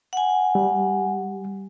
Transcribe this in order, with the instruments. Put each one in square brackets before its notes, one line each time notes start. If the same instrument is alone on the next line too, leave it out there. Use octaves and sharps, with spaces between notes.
[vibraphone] F#5 G#5
[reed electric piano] G3